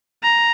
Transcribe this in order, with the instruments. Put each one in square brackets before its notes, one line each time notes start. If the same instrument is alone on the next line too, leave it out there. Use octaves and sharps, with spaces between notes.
[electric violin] A#5